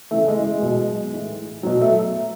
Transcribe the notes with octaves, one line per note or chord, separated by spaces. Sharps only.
C#3 E3 A3
G#3
G#3
B2 F#3
A2 E3
B2 F#3
A3